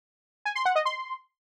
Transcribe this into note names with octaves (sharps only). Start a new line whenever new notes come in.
G#5
C6
F#5
D#5
C6